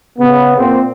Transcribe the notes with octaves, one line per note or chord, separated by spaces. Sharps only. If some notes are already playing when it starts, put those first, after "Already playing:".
C#3 B3
A#2 A#3 C4